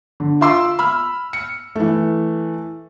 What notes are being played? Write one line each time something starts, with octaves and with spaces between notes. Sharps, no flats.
D3
F4 E5 C6 D6 E6
B5 E6 F6
C#7
E3 A3